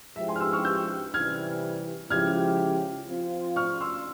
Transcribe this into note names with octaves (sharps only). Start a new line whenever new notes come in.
F3 G#3 E4 G4 E5
G#5 C6
F6
C6 E6
C#6 F6
E6 G6
C3 E3 G3 F6 G#6
C#3 F3 G#3 E4 G4 F6 G#6
F3 C4 F4
C#6 F6
C6 E6